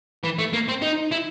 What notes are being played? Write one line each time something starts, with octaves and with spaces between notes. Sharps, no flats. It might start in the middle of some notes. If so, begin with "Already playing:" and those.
E3
A3
A#3
C4
D#4
E4